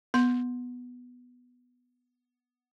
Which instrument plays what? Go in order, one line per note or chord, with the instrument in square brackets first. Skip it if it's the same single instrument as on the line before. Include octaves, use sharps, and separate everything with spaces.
[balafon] B3 C6